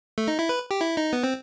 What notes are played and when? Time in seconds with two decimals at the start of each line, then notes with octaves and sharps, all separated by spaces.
0.18 A3
0.28 D#4
0.39 E4
0.49 B4
0.71 G4
0.81 E4
0.97 D#4
1.13 B3
1.23 C4